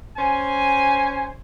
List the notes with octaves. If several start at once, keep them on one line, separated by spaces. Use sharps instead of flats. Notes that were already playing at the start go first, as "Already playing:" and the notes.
C#4 C5 G#5